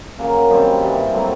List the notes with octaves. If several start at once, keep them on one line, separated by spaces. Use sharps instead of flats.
C#3 F#3 A#3
F#2 D#3 G3 C4
G2 E3 G3
F#3 A3 C4 E4